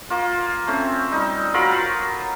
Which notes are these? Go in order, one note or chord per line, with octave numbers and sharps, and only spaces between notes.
A#3 F4
A3 C4 C#4
G3 D#4
F#3 F4 A#4 B5